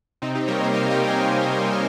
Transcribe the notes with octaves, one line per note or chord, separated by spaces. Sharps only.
C3 C4 D#4
D#4 G4
G3 A#3 A#4 C#5
C5 D#5
C3 C#5 F5
D#5 G5
G3 A#3
F5 G#5